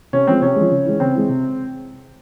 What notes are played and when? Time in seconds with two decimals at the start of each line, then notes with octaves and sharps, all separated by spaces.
0.13 C3 C#4
0.27 F3 G#3 C4
0.41 C3 C#4
0.56 F3 G#3
0.71 C#3
0.85 E3 G#3
1.00 C#3 C4
1.15 E3 G#3
1.29 C3